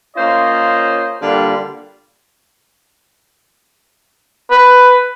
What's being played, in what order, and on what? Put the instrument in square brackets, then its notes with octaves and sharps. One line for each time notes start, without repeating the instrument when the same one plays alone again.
[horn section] A#3 C#4 F4 C5 C#5 D#5
D3 G3 A#3 F4
[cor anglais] B4